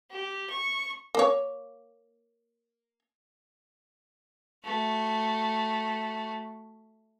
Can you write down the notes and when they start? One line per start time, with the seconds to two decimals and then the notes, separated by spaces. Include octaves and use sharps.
0.10 G4
0.50 C#6
1.15 A#3 C#5
4.64 A3 F#4